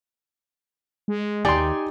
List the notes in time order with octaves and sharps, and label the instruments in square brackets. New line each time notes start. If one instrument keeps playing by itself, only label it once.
[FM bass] G#3
[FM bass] D#2 [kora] D#4 G4 D5 [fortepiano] G#5 C6